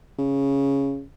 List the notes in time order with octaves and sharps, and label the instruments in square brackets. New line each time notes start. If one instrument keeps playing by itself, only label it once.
[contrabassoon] C#3